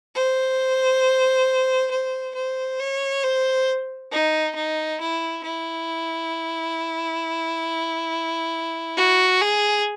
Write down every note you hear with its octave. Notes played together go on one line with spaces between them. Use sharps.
C5
C5
C5
C#5
C5
D#4
D#4
E4
E4
F#4
G#4